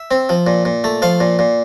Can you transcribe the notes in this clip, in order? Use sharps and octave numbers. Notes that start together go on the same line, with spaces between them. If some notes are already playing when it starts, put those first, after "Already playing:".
Already playing: E5
C4
F3
A#2
A#2
A3
F3 F5
A#2
A#2